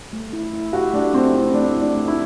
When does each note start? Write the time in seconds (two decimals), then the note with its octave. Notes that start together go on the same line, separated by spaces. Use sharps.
0.13 A3
0.33 E4
0.53 E4
0.73 F#4 G4
0.93 A3 D4
1.13 A3 C4
1.34 C4 E4
1.54 A3 D4
1.75 E4
1.81 D4
1.95 A3
2.08 E4